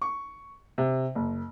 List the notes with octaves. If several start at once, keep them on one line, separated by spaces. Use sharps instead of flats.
C#6
C3
F#1